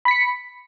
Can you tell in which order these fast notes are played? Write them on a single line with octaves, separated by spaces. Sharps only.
B5 B6 C#7